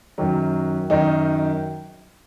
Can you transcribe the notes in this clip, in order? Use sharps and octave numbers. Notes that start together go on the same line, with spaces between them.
F#2 D#3 F#3
F#2 D#3 F#3 D#4